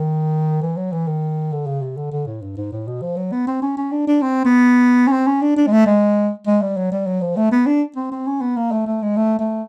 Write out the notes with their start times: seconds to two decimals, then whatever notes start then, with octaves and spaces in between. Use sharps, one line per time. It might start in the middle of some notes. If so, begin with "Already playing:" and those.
Already playing: D#3
0.62 E3
0.77 F#3
0.92 E3
1.07 D#3
1.52 D3
1.66 C#3
1.82 C3
1.97 D3
2.12 D3
2.27 A2
2.42 G2
2.57 G#2
2.72 A2
2.87 B2
3.02 F3
3.17 F#3
3.32 B3
3.47 C4
3.62 C#4
3.77 C#4
3.92 D4
4.07 D4
4.22 C4
4.45 B3
5.07 C#4
5.12 C4
5.27 C#4
5.42 D4
5.57 D4
5.67 G#3
5.72 A3
5.86 G#3
6.47 G#3
6.62 G3
6.77 F#3
6.92 G3
7.07 F#3
7.22 F3
7.36 A3
7.52 B3
7.66 D4
7.96 C4
8.12 C4
8.27 C#4
8.41 B3
8.56 A#3
8.72 A3
8.87 A3
9.02 G#3
9.17 A3
9.39 A3